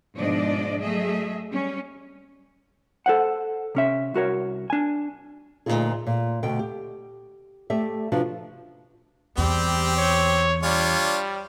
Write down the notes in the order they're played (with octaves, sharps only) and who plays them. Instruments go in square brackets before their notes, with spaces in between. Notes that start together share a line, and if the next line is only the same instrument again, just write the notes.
[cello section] G#2 B2 F3 D4 D5 D#5
F#3 A3 G#4 D#5 E5
G3 C#4
[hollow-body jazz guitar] A4 C5 F#5
C3 C#4 E5
C2 F#4 A#4 C#5
D4 G#5
[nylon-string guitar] D2 A#2 C#3 D#4 F4 G#4
A#2
D2 B2 G5
G4
A3 G4 D5 E5
C3 F3 B3 D4 F#4
[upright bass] E2 [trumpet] G3 [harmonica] C4 G4
[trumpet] C#5
[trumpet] G3 [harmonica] D4 F4 C#5